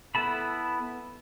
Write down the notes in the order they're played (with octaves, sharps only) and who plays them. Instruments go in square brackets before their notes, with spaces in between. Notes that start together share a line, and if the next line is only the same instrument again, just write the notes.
[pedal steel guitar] B3 E4 A4 A5 B5